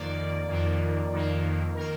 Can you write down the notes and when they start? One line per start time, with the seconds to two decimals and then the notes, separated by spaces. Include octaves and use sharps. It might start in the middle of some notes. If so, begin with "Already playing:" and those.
Already playing: F2 D#3 A#3 D5
0.48 F2 D#3 A#3
1.12 F2 D#3 A#3
1.75 D#3 A#3 A#4